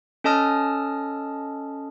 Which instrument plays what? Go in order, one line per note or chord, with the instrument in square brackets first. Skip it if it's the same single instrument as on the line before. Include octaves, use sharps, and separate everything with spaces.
[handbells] C#4 A4 D#5 A5 D#6 F6